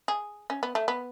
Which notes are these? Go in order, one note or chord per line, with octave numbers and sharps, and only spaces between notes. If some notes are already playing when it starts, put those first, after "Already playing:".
G#4
C#4
B3
A3
B3